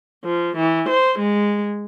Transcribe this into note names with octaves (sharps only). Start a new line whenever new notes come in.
F3
E3
C5
G#3